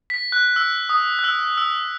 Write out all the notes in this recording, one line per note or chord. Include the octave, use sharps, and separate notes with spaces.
B6
F#6
E6
D#6
F#6
E6
E6